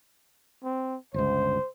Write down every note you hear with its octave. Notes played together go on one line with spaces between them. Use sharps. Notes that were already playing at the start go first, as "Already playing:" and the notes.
C4
G1 C#2 C5